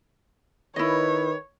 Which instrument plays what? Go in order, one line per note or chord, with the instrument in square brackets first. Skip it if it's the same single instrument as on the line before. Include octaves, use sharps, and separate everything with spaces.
[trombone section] D#3 B4 [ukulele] E4 D#5 [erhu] C#5